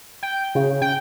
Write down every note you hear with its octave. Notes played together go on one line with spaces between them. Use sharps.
G5
C#3
G5